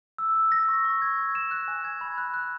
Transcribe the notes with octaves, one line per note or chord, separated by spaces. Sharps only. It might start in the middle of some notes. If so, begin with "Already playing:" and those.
E6
E6
A#6
C#6
C#6
G#6
C#6
E7
F#6
G#5
G#6
B5
F#6
F#6